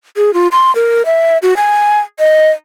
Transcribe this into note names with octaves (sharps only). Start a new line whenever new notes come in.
G#4
F4
C6
A#4
E5
F#4
G#5
D#5